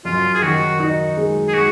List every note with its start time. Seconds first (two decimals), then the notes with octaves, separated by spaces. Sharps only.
0.05 F#2 F4
0.34 G#4
0.42 D#3 F#4
0.80 D#4
1.17 G#3
1.48 G#4
1.54 G#3 F#4